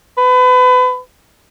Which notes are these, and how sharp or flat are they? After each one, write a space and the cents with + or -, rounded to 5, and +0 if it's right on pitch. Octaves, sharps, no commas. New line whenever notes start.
B4 +30